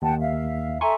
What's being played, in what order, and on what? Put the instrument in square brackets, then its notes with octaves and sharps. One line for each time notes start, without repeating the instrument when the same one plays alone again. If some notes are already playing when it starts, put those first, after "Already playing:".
[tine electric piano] D#2 [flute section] F#5 G5 A5
[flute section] E5 F5
[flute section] A4 E5 A#5 [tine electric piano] G#5 C6 C#6